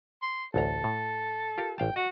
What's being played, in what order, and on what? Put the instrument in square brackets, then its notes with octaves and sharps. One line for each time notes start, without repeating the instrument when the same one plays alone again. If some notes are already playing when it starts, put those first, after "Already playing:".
[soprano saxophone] C6
[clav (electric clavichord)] A1 D2 A#5 [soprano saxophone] A4
[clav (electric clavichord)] A2
F4 G4 A#4
[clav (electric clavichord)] A1 F5 A5 [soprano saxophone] G5
[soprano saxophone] F#4 [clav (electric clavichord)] D#5